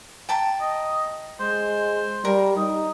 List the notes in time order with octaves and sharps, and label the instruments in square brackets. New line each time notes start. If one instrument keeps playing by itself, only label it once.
[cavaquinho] G5 A5 A#5
[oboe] D#5
[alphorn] G#3 [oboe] C5
[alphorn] G3 [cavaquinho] A#4
[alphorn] D#4 [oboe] D#6